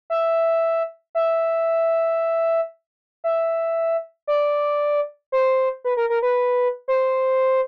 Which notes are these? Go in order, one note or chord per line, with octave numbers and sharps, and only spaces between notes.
E5
E5
E5
D5
C5
B4
A#4
A#4
B4
C5